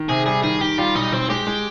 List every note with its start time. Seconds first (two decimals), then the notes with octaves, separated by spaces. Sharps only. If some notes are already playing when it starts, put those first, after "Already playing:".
Already playing: D#3
0.09 C3 G#4
0.26 G3 G#4
0.43 D#3 G#4
0.60 D#3 G4
0.78 G3 F4
0.95 B1 D#4
1.13 B1 C4
1.30 G#3 G4
1.47 G#3